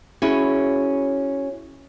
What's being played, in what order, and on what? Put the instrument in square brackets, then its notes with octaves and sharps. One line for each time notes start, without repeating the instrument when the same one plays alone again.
[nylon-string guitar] C#4 E4 F#4 G#4